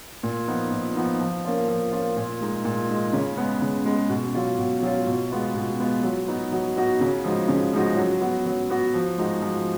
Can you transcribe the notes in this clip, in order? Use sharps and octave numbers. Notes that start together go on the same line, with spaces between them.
A#2
F3 B3 D#4
A#2
F3 B3 D#4
F3
A#3 C#4 F4
F3
A#3 C#4 F4
A#2
G#3 D#4
A#2
G#3 D#4
C#3
G#3 B3
C#3
G#3 B3
B2
F#3 C#4 F4
B2
F#3 C#4 F4
B2
G#3 B3 F4
B2
G#3 B3 F4
F#3
B3 D#4 F#4
F#3
B3 D#4 F#4
C#3
F3 G#3 D#4 F#4
C#3
F3 G#3 D#4 F#4
F#3
B3 F#4
F#3
B3 F#4
F3
G#3 D#4 F#4
F3